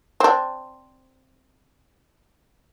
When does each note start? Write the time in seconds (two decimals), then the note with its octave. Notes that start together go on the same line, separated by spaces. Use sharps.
0.20 C4 D4